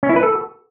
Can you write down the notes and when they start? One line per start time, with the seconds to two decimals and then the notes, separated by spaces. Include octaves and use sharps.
0.03 C#4
0.09 E4
0.16 B4
0.23 A4